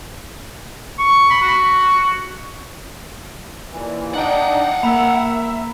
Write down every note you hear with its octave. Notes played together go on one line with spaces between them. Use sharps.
C#6
B5
F#4
D#2 A#2 E3
D4 D#4 F#5 G5
A#3 E5 A#5 B5